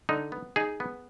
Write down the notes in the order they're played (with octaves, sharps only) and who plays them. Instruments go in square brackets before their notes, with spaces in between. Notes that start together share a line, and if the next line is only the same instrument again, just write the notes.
[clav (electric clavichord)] D3 D#4
B3
D#4 G#4
B3